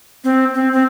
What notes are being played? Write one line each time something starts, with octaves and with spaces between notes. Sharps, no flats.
C4
C4
C4